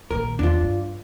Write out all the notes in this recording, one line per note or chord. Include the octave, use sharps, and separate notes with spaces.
A#1 D#3 A#4
E2 D4 F4
G2